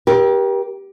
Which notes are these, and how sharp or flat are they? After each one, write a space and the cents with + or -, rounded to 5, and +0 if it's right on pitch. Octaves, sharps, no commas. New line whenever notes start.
G4 +0 A#4 +40